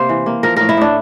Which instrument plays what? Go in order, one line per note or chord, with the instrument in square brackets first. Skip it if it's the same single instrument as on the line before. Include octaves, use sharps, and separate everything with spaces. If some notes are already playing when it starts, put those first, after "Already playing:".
Already playing: [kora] C3 A#3 C5
E3
A#3
F3 A#4
A2 A#4
E4
A2 D4